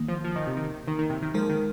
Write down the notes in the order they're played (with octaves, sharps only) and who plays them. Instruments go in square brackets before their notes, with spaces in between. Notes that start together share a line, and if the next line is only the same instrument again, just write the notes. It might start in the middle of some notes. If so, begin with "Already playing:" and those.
Already playing: [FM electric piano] D#3 A#3
[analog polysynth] F3
F3
D#3
C3
D#3
D#3
D#3
C3
D#3
[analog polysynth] F3 [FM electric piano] G#3 D#4 A#4
[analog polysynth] D#3